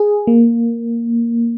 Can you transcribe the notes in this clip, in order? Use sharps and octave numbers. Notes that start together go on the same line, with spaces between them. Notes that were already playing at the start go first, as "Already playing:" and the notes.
Already playing: G#4
A#3